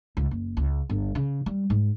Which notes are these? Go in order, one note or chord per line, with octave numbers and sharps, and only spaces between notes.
C#2
F#1
C#2
G1
C#3
G3
G#2